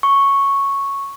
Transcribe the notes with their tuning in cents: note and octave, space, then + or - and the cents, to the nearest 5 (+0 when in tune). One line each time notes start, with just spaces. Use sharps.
C#6 -5